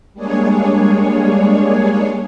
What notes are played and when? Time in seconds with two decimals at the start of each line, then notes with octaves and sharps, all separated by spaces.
0.14 G3 G#3 A#3 D4 G#4 C#5